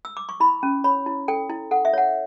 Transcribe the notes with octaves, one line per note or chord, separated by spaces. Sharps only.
E6
D6
C#6
E4 B5
C#4
C#5 B5
E4
A4 G5
E4
A4 F#5
E5
C#5 F#5